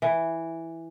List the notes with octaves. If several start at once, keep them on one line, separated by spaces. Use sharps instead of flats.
E3